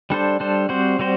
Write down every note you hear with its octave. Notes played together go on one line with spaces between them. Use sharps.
G3 D4 A4 C5
G3 D4 A4 C5
G3 C4 F#4 C5
G3 C4 F#4 C5